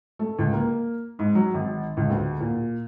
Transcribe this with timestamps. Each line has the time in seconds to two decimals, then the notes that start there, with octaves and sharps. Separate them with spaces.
0.19 A3
0.39 C#2
0.53 A#3
1.19 G#2
1.35 F#3
1.54 G#1
1.97 C#2
2.10 D2
2.41 A#2